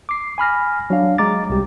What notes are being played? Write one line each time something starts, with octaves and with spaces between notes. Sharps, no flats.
D6 C7
G#5 B5 F6 A#6
F#3 D4 F5
G#3 A#5 D6 A6
C2 G4